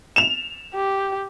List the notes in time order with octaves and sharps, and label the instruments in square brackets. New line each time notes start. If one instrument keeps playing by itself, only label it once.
[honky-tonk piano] E7 F7
[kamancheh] G4